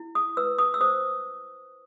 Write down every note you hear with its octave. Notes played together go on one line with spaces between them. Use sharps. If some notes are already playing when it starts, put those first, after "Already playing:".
Already playing: E4
D#6
B4 E6
D#6
E6
C5 D#6